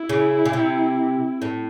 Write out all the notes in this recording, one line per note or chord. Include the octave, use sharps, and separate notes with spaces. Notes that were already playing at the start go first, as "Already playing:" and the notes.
Already playing: E4
C#3
C#3
C3
A2